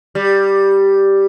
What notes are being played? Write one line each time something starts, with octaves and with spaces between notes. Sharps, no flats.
G3